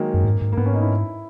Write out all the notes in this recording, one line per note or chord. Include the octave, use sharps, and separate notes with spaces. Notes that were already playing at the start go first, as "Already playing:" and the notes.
Already playing: D#3 F#3 G#3 A#3
F#2
G#2
G#2
A#3
G#2 B3
C#4
D#4
E4